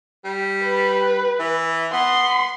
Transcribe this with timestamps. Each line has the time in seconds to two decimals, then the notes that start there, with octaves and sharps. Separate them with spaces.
0.25 G3
0.63 B4
1.40 E3
1.93 B3 C6